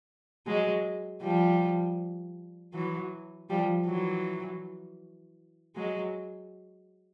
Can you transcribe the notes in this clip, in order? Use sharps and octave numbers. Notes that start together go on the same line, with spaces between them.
F#3 G#3
F3 G3
E3 F#3
F3 G3
E3 F#3
F#3 G#3